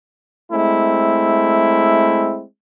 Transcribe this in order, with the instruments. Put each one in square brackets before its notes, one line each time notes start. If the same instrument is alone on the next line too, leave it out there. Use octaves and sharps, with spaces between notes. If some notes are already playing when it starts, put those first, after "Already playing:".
[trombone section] G#3 A3 C4 E4